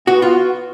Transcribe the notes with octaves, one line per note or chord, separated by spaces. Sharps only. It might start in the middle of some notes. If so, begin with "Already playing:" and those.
B3 F#4
F4 F#4